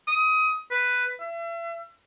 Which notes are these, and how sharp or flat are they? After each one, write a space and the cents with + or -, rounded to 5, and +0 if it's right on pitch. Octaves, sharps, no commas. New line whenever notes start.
D#6 +25
B4 +5
E5 +40